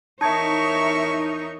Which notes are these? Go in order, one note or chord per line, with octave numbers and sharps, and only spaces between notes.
E2 D#4 A#4 C#5 E5 A5 C#6 G#6